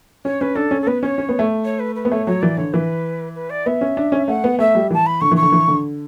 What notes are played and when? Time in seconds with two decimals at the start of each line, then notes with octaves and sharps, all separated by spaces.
0.25 C#4 C#5
0.41 C#4 B4
0.56 D4 A4
0.71 C#4
0.82 A4
0.87 B3 B4
1.03 C#4 C#5
1.18 C#4
1.29 B3
1.39 A3
1.65 C#5
1.79 B4
1.95 B4
2.05 B3
2.11 A3 C#5
2.27 F#3 C#5
2.42 E3 D5
2.57 D3 C#5
2.73 E3 B4
3.35 B4
3.50 D5
3.66 B3 E5
3.81 C#4
3.97 D4
4.12 C#4
4.28 A3 F#5
4.44 B3
4.59 A3 E5
4.75 G3
4.90 E3 A5
5.06 B5
5.21 D3 C#6
5.31 E3 C#6
5.42 D3
5.52 E3
5.68 D3